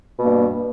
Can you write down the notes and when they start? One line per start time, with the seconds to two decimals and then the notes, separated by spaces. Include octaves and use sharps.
0.18 B2
0.21 A#3
0.24 G2